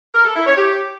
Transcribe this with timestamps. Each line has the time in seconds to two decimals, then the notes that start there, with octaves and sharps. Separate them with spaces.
0.14 A#4
0.25 A4
0.36 E4
0.46 C#5
0.57 G4